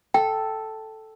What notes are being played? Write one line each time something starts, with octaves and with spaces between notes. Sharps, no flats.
A4 G5